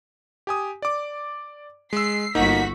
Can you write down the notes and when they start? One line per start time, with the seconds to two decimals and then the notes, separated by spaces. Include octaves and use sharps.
0.47 G4 G#5 D#6
0.82 D5 D6
1.93 G#3 E6 C7
2.35 G1 A#3 D#4 F#4 B6